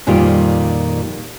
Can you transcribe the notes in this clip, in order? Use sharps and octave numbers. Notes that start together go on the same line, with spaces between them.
F2 A#2 D#3 G3 F4